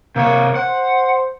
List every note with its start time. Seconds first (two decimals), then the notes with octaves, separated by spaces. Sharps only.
0.16 C3 A#3 C#5
0.56 C5 F#5